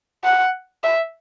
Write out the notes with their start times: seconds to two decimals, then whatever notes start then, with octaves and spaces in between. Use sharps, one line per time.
0.24 F#5
0.84 E5